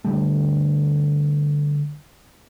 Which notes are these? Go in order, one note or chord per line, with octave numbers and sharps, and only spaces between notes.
D3 G3 A3